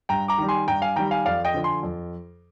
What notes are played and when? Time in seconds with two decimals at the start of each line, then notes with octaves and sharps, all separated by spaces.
0.09 G2 G5 A#5
0.28 A#5 D6
0.38 D#3 G3
0.49 G#5 C6
0.68 G2 G5 A#5
0.82 F5 G#5
0.96 D#3 G3 G5 A#5
1.11 F5 G#5
1.26 F2 D5 F5
1.45 D#5 G5
1.54 D3 F3
1.64 G#5 C6
1.83 F2